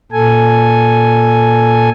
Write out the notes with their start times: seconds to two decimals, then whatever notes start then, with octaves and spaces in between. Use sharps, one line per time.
0.12 A#2 A4 G#5